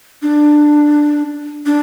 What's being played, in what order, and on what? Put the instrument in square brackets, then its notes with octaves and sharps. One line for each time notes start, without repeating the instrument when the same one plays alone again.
[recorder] D4
D4